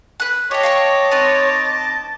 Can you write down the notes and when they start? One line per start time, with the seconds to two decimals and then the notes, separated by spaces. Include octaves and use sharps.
0.20 B4 F#6
0.51 G4 C#5 D#5 G5 A5 D6
0.63 F5 G5 C#6
1.11 C4 D#4 B4 A6